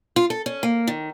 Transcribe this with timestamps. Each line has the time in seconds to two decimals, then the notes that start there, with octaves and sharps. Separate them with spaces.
0.16 F4
0.30 A4
0.46 C#4
0.63 A#3
0.87 D#3